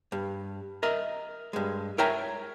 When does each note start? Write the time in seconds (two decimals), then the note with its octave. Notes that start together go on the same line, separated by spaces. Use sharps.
0.12 G2
0.83 A#4 D#5 E5
1.53 G2 G#3
1.98 A#4 C#5 E5 G5 G#5 A#5